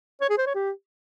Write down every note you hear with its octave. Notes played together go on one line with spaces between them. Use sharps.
C#5
G#4
C5
C#5
G4